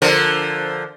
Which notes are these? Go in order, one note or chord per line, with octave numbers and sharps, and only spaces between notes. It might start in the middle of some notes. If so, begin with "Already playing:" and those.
D3 F3 A#4